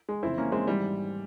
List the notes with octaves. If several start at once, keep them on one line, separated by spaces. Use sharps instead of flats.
G#3
F1 F2 C#3 E3 C4 E4
A#3 C#4
G#3 C4
G#1 G#2 E3 G3